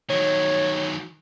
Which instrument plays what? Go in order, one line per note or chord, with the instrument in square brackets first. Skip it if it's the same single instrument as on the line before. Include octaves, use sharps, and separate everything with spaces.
[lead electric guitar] D#3 F#3 [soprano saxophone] C#5